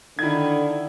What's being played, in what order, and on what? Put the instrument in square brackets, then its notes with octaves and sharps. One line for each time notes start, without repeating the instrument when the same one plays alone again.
[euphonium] D3 [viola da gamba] D#3 [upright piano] E4 G#6